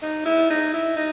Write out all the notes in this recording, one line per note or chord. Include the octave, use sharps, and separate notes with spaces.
D#4
E4
D#4
E4
D#4